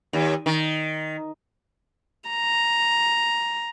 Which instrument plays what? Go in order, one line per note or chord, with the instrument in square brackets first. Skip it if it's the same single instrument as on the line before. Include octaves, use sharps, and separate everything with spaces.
[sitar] D#2
D#3
[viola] A#5